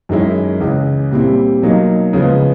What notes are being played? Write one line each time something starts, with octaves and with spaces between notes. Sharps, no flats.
F#2 D#3 G#3 C#4 E4
C#2 C#3 E3
A#2 G3 C4 E4
B2 F#3 A#3 D#4
C#3 F3 G#3 B3